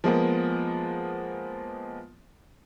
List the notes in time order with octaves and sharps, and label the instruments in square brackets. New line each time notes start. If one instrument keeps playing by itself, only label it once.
[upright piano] F3 G#3 A#3 B3